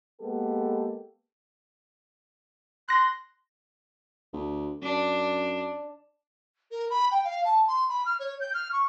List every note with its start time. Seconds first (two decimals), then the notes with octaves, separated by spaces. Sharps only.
0.21 G#3 A#3 B3 G4 A4
2.89 C6 F#6 A#6
4.33 D2
4.82 F#2 D4
6.71 A#4
6.90 B5
7.11 G5
7.24 F5
7.45 A5
7.67 C6
7.89 B5
8.06 F6
8.19 C#5
8.40 G6
8.54 F6
8.72 C#6